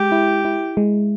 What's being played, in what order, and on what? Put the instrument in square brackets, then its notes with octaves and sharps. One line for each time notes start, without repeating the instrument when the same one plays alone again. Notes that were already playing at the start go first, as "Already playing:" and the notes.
Already playing: [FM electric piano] G#3 [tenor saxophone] G4
[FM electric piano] E4
E4
G#3